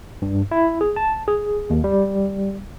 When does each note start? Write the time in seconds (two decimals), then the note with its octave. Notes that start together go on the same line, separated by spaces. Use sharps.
0.22 G2
0.51 E4
0.81 G#4
0.96 A5
1.28 G#4
1.70 D#2
1.84 G3